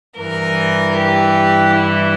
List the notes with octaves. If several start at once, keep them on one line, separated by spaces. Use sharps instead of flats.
G2 E3 A#4
G4
E4